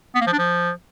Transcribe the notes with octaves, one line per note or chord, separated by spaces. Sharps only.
B3
A#3
F3
D4
F3